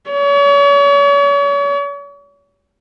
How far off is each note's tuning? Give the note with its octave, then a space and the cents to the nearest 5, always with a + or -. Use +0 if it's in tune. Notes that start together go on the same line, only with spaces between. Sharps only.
C#5 +40